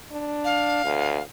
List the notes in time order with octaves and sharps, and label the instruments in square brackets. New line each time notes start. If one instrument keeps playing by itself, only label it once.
[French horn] D4
[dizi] F5
[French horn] D2